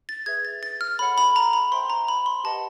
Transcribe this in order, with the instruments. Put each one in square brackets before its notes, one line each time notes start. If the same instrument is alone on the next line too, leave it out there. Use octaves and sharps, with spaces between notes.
[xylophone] A6
G#4 B4 E5 G#6
A6
A6
F6
A4 C#5 F#5 B5
B5
A#5
B5
C5 E5 G5 C6
A#5
B5
C6
G4 B4 D#5 F#5 A5